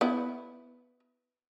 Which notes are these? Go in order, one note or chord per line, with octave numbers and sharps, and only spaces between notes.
B3 E4